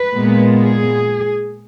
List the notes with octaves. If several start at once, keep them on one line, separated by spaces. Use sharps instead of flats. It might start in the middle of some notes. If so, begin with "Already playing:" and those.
Already playing: B4
A#2 G#3 B3
G#4